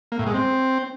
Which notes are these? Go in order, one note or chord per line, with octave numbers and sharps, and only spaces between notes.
A#3
A2
G#3
C4